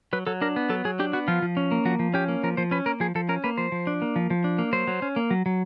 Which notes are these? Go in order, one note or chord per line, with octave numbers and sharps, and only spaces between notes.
F#3 B4
F#3 A4
D4 A#4
B3
F#3 A4
F#3 G#4
D4 G4
B3 F#4
F3 F4
F3
C#4
A#3
F3 F#4
F3
C#4 G4
A#3
F3 A#4
F3 C5
C#4 B4
A#3 A#4
F3 G#4
F3 A4
C#4 A#4
A#3 B4
F3 C5
F3
D4
A#3
F3
F3
D4
A#3
F#3 C5
F#3
C#4
A#3
F#3
F#3